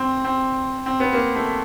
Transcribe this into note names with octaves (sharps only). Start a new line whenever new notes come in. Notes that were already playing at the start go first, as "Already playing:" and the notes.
Already playing: C4
C4
C4
B3
A#3
A3